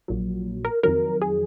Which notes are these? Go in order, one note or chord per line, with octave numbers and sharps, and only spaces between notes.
A#1 A#2 F#3
A#4
F2 D#3 F#3 A#4
G#4